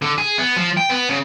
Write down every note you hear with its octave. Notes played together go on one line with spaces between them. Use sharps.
D3
G#4
B3
F3
G5
B3
C#3